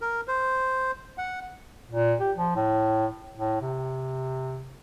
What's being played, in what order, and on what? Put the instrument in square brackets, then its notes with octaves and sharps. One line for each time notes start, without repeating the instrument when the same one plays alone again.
[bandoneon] A#4
C5
F#5
[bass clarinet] A#2
G4
F3
A2
A2
C3